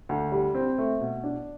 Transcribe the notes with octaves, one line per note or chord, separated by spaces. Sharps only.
D2
G3
C4
A3
B2
D4